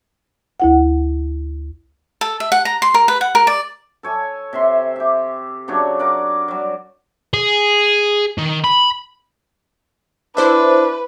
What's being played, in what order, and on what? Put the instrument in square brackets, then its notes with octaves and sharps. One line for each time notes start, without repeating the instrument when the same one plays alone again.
[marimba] D2 E4 F#5
[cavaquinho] A4
E5
F#5
A#5
C6
A#4
B4
F#5
A#4
D5
[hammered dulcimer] A4 C#5 G#5
C3 E5 C6
G4 E5
C#3 F#3 D4 C#5
A#4 D5 F#5
F#3 G3
[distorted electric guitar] G#4
D#3
B5
[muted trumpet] D4 [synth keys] E4 C5 E5 [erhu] B4